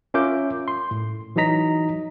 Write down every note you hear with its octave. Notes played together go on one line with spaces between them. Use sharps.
C#4 F4 A#4 E5 D6 G6
C6
A2
E3 F#3 D#4 D#5 A#5 B6